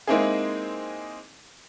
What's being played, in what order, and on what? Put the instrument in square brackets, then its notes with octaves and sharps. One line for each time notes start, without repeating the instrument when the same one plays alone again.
[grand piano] G#3 A#3 C4 D#4 E4 G#4